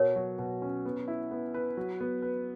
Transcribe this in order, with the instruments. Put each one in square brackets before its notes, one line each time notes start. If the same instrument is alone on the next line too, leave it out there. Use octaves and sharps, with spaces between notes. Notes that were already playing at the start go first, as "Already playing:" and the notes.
Already playing: [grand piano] B2 [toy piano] A#4 C#5
[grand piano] F#3
B2
C#4
B3
E4
B3
B4
F#3
B3
B4